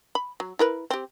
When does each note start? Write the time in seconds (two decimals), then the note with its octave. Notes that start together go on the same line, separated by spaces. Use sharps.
0.15 B5
0.40 F#3
0.59 E4 A#4 B4
0.90 C4 G4